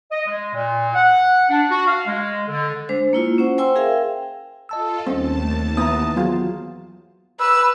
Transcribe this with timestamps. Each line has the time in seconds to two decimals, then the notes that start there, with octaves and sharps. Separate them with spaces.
0.11 D#5
0.27 G#3
0.54 A#2
0.94 F#5
1.50 D4
1.70 F#4
1.86 F5
2.07 G#3
2.48 D3
2.89 G#3 D4 C5
3.13 A#3 E4 F4
3.38 C#4 C5 F#5
3.58 C5 G5 G#5 C6 E6
3.76 G#4 A#4 E5 F5 G5
4.69 F4 A4 D#5 A5 E6
5.07 D#2 G3 C4 C#4 A5
5.43 A3
5.77 E3 B3 E4 A#5 D#6
6.16 F#3 B3 F4 G#4
7.40 B4 E6